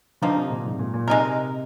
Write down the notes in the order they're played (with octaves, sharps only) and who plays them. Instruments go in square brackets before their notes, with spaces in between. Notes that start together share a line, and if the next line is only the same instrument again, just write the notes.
[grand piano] D3 [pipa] F3 A#3 D#4
[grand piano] C3
A#2
G#2
C3
A#2
A#2
[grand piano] C3 [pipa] G#3 D#4 A#4